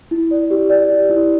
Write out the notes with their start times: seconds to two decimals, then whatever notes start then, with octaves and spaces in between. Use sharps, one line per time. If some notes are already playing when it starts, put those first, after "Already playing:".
0.11 E4
0.31 D5
0.51 G4
0.70 D5
0.90 G4
1.10 E4